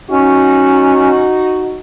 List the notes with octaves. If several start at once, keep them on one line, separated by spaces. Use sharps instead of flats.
C#4 D#4 F#4